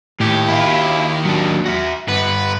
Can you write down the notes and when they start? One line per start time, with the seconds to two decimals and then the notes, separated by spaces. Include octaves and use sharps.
0.20 D#2 A2 G4
0.49 E4 F4
1.25 F#3 D4
1.66 F#4 E5
2.08 G2 B3 B4